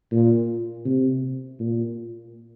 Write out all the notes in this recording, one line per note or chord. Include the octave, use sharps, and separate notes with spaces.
A#2
C3
A#2